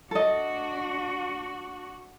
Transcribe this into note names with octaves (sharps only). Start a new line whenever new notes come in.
D4 F#4 A4 D#5